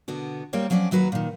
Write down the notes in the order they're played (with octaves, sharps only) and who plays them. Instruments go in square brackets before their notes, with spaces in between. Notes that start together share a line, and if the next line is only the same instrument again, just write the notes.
[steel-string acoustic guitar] B2 D3 B3 F#4
G3 A#3 C4 C#5 G5
F3 F#3 C4 C#4 D5
D#2 F#3 F#4 B4 A#5
A#2 D#3